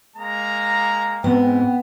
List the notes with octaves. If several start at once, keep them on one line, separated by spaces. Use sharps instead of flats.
G#3 A#3 A#5
G#2 B3 C4